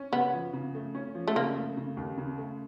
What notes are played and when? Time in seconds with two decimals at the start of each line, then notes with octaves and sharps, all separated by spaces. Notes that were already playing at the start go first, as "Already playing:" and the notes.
Already playing: C#4
0.12 C#3 B3
0.33 F3
0.53 C#3
0.75 A3
0.95 C#4
1.15 F3
1.28 A3
1.36 C#3 A#3
1.56 A3
1.77 C#3
1.97 D#2
2.18 C#3
2.38 A3